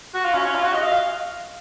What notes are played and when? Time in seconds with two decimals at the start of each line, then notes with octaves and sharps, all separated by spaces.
0.14 F#4
0.25 F4
0.34 C#4
0.45 C#4
0.55 F4
0.64 F#4
0.74 D#5
0.83 F5